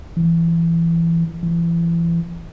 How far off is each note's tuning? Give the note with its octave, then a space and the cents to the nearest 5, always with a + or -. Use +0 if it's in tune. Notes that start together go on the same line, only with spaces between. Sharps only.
E3 +20
E3 +35